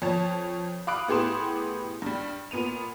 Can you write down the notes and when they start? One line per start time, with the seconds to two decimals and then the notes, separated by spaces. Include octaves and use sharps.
0.02 F2 C#5 A5
0.87 F5 B5 D6 D#6 F#6 D7
1.08 A2 B3 G4 G#4 C6 E7
2.02 G2 G3
2.51 A#2 B3 D#7 F7